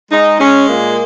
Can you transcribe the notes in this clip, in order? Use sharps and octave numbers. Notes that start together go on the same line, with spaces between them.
G#3 D#4
G#3 C#4
A#2 A#3